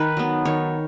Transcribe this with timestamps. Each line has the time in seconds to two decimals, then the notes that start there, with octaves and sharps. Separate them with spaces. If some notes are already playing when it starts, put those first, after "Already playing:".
Already playing: D#3 B4
0.17 F#3 B3
0.45 D#3 C#5